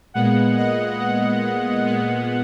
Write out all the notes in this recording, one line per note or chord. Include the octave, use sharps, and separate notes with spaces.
A#2 G#3 B3 F#5
D#5
F#5
A#2 G#3 B3